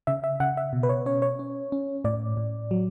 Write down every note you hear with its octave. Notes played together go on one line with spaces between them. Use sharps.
C#3 E5
E5
C#3 F#5
E5
B2
B4
C#5
C#4 C#5
C#5
C#4
C#4
A2 D5
A2
F#3